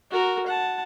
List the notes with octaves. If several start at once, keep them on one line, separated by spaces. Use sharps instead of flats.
F#4 A#4
F#5 A5